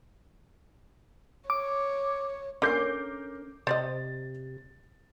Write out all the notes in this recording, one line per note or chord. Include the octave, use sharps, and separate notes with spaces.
C#5 D6
D3 C#4 A#4 D6 G6 C7
C3 C5 D5 D#5 A6